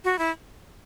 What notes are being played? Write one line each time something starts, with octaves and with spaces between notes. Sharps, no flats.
F#4
E4